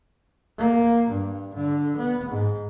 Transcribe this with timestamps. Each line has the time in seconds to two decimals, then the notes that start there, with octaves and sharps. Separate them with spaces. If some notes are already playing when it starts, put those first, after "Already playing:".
0.59 A#3
1.10 G2
1.55 D3
1.97 B3
2.30 G#2